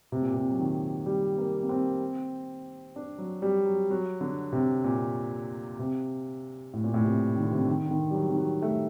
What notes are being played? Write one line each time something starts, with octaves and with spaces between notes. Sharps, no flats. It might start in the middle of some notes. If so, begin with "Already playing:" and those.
C3
A#2
C3
F#3
D#3
G3
A#3
A#3
C4
D4
F#3
G3
F#3
F#3
D3
C3
A#2
C3
A2
A#2
A2
C3
D#3
D3
C3
D3
D#3
D3
D#3
G3
F#3
D#3
F#3
A3